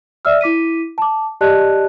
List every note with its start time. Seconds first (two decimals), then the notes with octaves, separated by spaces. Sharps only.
0.25 D5 E5 E6 F6
0.41 E4 D6 B6 D#7
0.98 A5 D6
1.41 G4 D5 D#5 A5 F#6